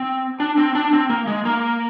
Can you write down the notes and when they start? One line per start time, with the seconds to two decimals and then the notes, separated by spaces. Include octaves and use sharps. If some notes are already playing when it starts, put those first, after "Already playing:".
Already playing: C4
0.40 D4
0.57 C4
0.75 D4
0.93 C4
1.10 A#3
1.27 G#3
1.45 A#3